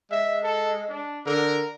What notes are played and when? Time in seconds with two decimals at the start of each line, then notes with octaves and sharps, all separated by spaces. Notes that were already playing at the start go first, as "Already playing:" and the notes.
0.11 G#3 E5
0.44 A4
0.89 D4
1.26 D3 A#4